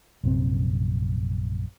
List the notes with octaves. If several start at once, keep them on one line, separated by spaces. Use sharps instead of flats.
A#1 F#2 C3 C4